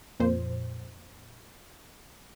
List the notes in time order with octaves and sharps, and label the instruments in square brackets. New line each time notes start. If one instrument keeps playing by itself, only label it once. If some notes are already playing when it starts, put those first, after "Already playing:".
[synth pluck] F2 A#2 C5